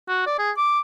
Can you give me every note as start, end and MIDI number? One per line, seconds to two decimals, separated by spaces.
0.09 0.25 66
0.27 0.37 74
0.39 0.51 68
0.58 0.80 86